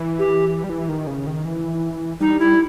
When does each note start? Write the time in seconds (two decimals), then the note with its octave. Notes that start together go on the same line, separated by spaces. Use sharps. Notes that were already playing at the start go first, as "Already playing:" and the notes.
Already playing: E3
0.19 G4
0.64 G3
0.70 E3
0.89 D#3
1.07 C#3
1.27 D#3
1.45 E3
2.20 G3 D#4
2.39 E4